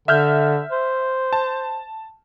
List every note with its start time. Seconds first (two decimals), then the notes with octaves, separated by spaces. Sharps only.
0.08 D3 E5 F6 G6
0.72 C5
1.33 A5